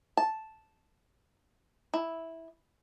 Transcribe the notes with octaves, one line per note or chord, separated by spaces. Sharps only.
A5
E4